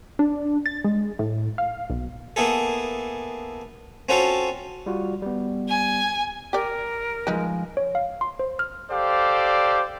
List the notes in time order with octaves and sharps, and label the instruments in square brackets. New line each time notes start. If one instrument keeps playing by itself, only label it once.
[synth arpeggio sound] D4
A6
G#3
A2
F5
B1
[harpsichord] A#3 B3 E4 G#4 A4
C4 C#4 F4 F#4 A4 F5
[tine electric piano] G3 F4 F#4
G3 B3
[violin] G#5
[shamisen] G4 D5 [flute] A#4
[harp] F3 G#3 [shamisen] D#4 B4
[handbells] C#5
F5
C6
C5
F6
[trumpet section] G4 A4 C5 D5 F5